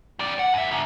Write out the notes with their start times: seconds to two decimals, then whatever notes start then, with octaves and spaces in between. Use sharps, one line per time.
0.19 F2 D5
0.39 F#5
0.54 F#2 E5
0.71 G#2 D3